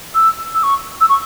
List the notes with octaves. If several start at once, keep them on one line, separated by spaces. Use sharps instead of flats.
E6
E6
C#6
E6
C#6